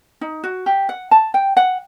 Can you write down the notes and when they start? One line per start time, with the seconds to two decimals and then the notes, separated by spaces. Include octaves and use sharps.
0.21 D#4
0.44 F#4
0.66 G4
0.89 F#5
1.11 A5
1.34 G5
1.57 F#5